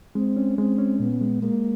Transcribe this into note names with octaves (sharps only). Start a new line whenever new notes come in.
G#3 C4
C#4
G#3 C4
C#4
A#2 B3
G#3
G#3 A#3